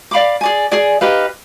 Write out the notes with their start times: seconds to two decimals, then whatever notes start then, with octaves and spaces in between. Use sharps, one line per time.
0.11 D5 F5 B5 D6
0.41 G#4 D5 G#5
0.71 G#4 D5 G#5
1.01 D#4 G4 B4 F5